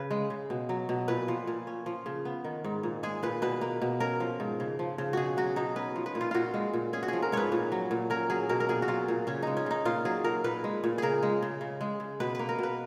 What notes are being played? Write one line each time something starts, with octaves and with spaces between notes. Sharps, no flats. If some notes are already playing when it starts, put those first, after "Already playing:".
Already playing: C#3 B4
G#3
C#3
B2
F#3
B2
A#2 B4
F3
A#2
C#4
F3
C#3
B3
D#3
G#2
A#2
G#3 G#4
A#2 B4
B2 B4
A#3
B2
C#4 A#4
F3
G#2
C#3
F3
C#3
B2 F#4 G#4
F#3 F#4
B2 D#4
C#4 B4
F3
B4
A#2
F4
A#2 F4 F#4
G#3
A#2
C#4 G#4
F#4
F3 G#4
A#4
G#2 B4 C#5
A#2
F#3
A#2
C#4 A#4
F#3 G#4
B2 A#4
A#4
A#2 G#4
F#4
F#3 F4
A#2
C#3 C#4
G#3 D#4
C#4
C#3 D#4
A#2 F4
F#3 G#4
A#2 A#4
A#2 B4
G#3
A#2
C#3 G#4 A#4
G#3
C#3
C#3
G#3
C#3
B2 B4
A#3 B4
A#4
B2 B4